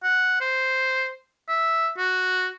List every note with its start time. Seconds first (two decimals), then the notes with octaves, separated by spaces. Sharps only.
0.03 F#5
0.40 C5
1.48 E5
1.97 F#4